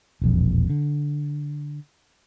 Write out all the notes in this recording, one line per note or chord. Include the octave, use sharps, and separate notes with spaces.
E1 A#1 F2
D3